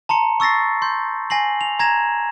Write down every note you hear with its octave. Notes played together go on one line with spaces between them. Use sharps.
A5 A#5 C6 C#7
C#6 E6 A6 A#6 C7
C6 G6
G#5 A#6 C7 F#7
F7
A#5 G#6 A#6 E7